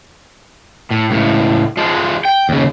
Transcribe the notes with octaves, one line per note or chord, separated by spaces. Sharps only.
A2
C#2 A2
F3 G#3
G5
D#2 C#3